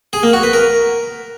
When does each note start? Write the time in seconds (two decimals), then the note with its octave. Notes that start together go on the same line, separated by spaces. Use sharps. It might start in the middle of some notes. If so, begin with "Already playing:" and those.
0.13 G#4
0.23 A#3
0.33 F#4
0.43 B4
0.53 A#4